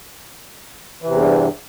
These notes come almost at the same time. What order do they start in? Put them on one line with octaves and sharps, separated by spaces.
E3 C3 E2 G2